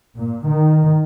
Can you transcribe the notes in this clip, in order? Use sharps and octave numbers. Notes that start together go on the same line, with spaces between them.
A#2
D#3